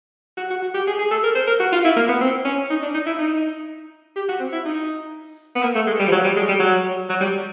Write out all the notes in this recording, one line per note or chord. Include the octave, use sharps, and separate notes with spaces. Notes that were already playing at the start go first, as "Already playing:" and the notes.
F#4
F#4
F#4
G4
G#4
G#4
A4
A#4
C5
A#4
F#4
F4
E4
A#3
B3
C4
C#4
D#4
D4
D#4
E4
D#4
G4
F#4
C4
E4
D#4
B3
A#3
A3
G#3
G3
F3
F#3
G3
G#3
G3
F#3
F#3
G3